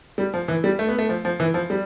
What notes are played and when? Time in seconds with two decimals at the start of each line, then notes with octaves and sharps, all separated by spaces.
0.18 G3
0.34 F3
0.48 E3
0.64 G3
0.79 A3
0.89 B3
0.98 A3
1.09 F3
1.25 F3
1.40 E3
1.54 F3
1.70 G3